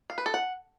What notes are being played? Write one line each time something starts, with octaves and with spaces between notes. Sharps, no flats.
F5
B4
A4
F#5